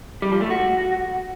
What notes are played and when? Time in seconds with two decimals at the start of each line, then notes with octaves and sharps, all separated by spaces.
0.22 G3
0.32 F3
0.41 A3
0.50 F#4